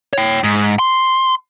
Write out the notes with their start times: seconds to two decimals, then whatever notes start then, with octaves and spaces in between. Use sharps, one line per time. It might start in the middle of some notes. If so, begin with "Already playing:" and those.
0.13 C#5 G5
0.44 G#2
0.79 C6